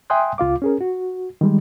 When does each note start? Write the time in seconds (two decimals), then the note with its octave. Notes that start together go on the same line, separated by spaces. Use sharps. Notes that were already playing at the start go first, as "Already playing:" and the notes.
0.10 E5 G5 G#5 C6 D#6 F#6
0.38 C#2 F4 F5 D6
0.62 C#4 G#4 A#4
0.81 F#4
1.41 D#3 G3 G#3